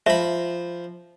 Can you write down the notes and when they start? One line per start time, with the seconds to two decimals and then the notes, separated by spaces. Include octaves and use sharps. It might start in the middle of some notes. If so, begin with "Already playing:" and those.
0.06 F3 E5 B5